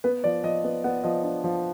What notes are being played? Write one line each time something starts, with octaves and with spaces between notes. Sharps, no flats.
B3 B4
F3 D5
F3 D#5
B3
B3 F#5
F3 D#5
D4
F3